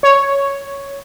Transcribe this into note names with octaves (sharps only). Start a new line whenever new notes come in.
C#5